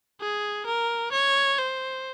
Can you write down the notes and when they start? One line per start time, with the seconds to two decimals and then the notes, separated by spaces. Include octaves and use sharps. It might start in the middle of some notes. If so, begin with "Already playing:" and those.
0.20 G#4
0.66 A#4
1.12 C#5
1.58 C5